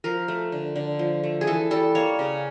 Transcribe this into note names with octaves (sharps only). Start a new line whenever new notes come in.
F3 A#4
A3
D3
D3
F3
A3
G#4
E3 A4
G3 A4
A#3 C#5
C#3